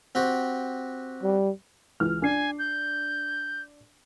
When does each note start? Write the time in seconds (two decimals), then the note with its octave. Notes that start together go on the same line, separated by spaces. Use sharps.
0.15 C4 F#4 G4
1.23 G3
2.00 C#2 E3 F6
2.22 D4 G#5 C7
2.59 G6